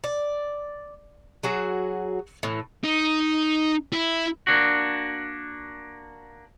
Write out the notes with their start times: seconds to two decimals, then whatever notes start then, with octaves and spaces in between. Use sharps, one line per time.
0.04 D5
1.43 F#3 F#4 G#4
2.43 A2 E3
2.84 D#4
3.93 E4
4.47 A#3 D4 F#4